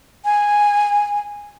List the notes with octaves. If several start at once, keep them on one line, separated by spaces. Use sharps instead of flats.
G#5